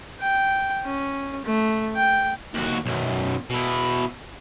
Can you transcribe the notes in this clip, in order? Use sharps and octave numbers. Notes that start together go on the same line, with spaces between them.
G5
C#4
A3
G5
D#2 F#4
B1 F#2
B2 E4